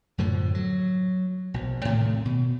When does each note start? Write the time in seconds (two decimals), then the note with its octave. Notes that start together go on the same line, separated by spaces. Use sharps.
0.18 F#2 A2 D3 F3
0.55 F#3
1.54 A#1 B2
1.85 A2 C3 D#3 A3
2.25 B2